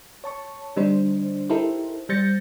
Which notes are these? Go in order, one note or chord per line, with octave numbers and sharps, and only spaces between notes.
C#5 A5 C#6
D3 G3 D4 D#4 C5
D#4 E4 G4 A4 A#4 C5
G3 C5 G6 A6 A#6 C#7